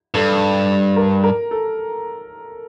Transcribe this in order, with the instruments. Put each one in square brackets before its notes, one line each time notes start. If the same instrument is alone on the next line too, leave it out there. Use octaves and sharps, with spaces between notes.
[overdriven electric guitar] G2 [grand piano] A4
[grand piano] A#4
A#4
A4